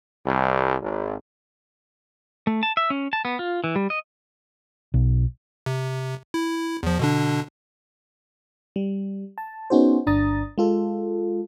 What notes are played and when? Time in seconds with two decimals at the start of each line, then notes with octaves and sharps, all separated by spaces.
0.25 C2
0.81 G#1
2.47 A3
2.63 A5
2.77 E5
2.90 C#4
3.13 A5
3.25 B3
3.39 F4
3.64 E3
3.76 G3
3.90 D#5
4.94 B1
5.66 C3
6.34 E4
6.83 E2 F3
6.99 B2 D3 D4
8.76 G3
9.38 A5
9.70 B3 C#4 D#4 F#4 G#4 C5
10.07 G1 D4 A#5 D#6 A6
10.58 G#3 F4 A4